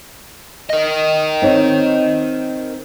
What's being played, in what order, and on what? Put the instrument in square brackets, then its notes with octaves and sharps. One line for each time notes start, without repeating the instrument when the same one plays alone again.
[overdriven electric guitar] A#4 D#5
[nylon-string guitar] C4 D#4 C#5